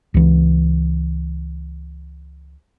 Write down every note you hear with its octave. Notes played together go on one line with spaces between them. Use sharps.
C#2 E3